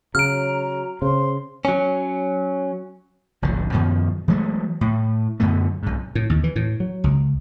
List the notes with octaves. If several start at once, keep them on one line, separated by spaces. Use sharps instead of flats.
C#3 F#3 A#5 F6 D7
C#3 C5 C6
F#3 C#4
F1 B1 A2 D3
F#2 B2 D#3 F3
E3 F#3 G#3 A3
A2
F#2 B2 D3 A3
B1 G#2
A2
D#2
E3
A2
F#3
C#2